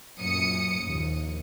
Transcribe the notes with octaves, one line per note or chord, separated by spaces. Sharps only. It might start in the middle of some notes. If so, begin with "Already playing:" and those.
F#2 A#2 D#6 C#7
A#1 D#2